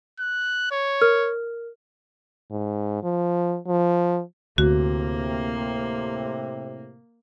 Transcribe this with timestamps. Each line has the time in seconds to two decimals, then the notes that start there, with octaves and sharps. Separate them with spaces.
0.20 F#6
0.71 C#5
1.01 A#4 F6
2.51 G#2
3.03 F3
3.67 F3
4.58 D2 A2 C3 A#3 F#4